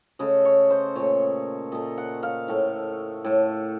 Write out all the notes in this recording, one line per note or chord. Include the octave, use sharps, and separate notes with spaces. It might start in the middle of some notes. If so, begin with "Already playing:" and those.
C#3 A3 D#5
C#5
C5
A#2 A3 C#5
A#2 A3 D#5
F#5
F5
A2 A3
A2 A3